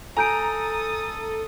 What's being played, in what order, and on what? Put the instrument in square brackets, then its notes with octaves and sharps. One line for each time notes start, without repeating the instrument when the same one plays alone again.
[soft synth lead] A4 [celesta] G#5 G6 D7 [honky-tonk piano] A#5 [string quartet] D#6 A6